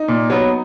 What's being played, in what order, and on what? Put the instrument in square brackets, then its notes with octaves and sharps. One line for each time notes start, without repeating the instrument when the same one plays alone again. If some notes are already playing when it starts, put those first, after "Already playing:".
Already playing: [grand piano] D#4
[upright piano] A#2
F#3 B3